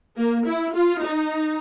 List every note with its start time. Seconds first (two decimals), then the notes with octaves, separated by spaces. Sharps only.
0.17 A#3
0.46 E4
0.75 F4
1.04 D#4